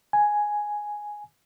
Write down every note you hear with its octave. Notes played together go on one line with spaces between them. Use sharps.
G#5